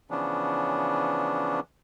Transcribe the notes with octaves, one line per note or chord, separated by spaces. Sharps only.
C#3 E3 F3 B3 C#4 D4